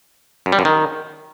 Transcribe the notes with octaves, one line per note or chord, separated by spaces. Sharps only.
F#2
G3
F#2
D#3